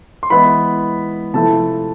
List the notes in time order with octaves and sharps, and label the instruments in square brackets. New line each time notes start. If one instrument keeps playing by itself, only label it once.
[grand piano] C6
E3 G#3 B3 E4 B5
C3 F3 A3 E4 A5